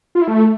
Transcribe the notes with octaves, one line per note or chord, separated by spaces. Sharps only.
F4
E4
A3